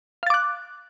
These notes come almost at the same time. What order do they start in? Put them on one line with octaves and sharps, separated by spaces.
F5 A6 D6 F#6